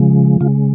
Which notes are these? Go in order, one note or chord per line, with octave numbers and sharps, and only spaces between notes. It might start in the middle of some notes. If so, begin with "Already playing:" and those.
Already playing: C#3 F3 G#3
C#3 G#3 F4